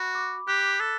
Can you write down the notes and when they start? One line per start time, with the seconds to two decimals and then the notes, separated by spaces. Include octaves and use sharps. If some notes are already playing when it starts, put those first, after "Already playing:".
Already playing: F#4 B5
0.15 D6
0.48 G4 F#6
0.80 A4 B6